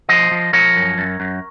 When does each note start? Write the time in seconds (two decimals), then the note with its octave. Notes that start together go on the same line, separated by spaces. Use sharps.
0.09 F3 C5 D#5
0.31 F3
0.53 F3 A#4 C#5
0.76 F#2
0.98 F#2
1.20 F#2